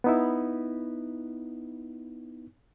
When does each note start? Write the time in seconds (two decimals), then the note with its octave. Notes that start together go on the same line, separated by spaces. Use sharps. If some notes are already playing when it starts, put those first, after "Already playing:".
0.04 B3 D#4 E4